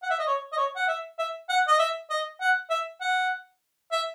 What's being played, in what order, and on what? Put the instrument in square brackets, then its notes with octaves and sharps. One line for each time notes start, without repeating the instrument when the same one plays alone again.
[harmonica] F#5
E5
D#5
C#5
D#5
C#5
F#5
E5
E5
F#5
D#5
E5
D#5
F#5
E5
F#5
E5